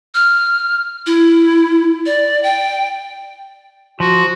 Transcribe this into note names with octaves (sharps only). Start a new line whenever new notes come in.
F6
E4
D5
G5
F3 F#4